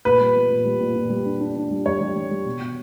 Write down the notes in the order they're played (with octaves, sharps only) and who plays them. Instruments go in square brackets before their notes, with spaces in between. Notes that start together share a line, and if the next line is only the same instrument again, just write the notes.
[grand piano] A#2 [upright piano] B4
[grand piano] G3
B3
A#2
G3
A#2
A#2
G3
D4
D4
D4
G3
[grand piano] G3 [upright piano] C#5
[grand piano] G3
G3
G3
B2
B2